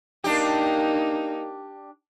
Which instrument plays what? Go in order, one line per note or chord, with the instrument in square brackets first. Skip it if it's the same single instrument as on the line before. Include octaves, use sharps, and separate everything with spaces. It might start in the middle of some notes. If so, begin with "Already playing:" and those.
[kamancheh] A#3 D#4 [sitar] D4 G4